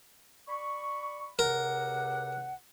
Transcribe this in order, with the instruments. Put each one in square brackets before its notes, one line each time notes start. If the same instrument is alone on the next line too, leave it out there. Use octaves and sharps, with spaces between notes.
[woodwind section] D5 B5 C#6
[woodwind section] C#2 C3 F#5 [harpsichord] A#4